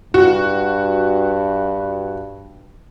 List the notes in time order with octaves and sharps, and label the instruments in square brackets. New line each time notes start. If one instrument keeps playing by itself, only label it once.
[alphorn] G2 [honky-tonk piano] F#4